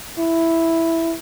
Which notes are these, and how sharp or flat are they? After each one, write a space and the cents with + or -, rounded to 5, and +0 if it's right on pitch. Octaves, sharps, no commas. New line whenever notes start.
E4 +0